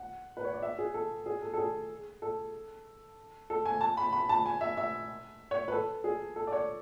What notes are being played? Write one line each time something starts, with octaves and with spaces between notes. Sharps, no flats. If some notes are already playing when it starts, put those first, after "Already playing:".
Already playing: F#5
B4
C#5
D5
E5
G#4
A4
G#4
A4
A4
G#4
A4
A4
G#5
A5
B5
B5
A5
G#5
E5
E5
C#5
B4
A4
G#4
A4
D5
C#5